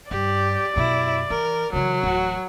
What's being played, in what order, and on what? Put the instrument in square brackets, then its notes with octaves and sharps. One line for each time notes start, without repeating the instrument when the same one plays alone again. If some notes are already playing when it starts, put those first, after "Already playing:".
[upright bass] G2 [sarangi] G4 [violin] D5
[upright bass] F#2 B2 [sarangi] E4
[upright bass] E3 [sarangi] A#4
[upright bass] C#3 E3 [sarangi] F#3
[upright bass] D1 E3 [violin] F#4